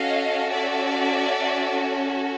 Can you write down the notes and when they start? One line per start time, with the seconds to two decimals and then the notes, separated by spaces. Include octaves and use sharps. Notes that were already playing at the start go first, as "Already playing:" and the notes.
Already playing: C#4 F#4 A4 D#5 F5
0.51 D5 E5